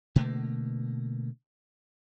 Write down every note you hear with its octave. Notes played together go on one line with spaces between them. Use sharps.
B2 D3 A3 A#3